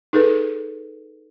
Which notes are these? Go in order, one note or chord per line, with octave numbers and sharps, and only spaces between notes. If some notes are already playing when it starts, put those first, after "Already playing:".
D#4 G#4 A4 B4